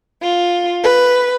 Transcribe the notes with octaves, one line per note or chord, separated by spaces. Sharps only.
F4
B4